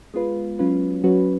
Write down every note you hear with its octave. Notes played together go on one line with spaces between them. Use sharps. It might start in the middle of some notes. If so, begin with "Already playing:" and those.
G#3 B3 F4 B4
F#3 C#4 F4 B4
F#3 C#4 F#4 B4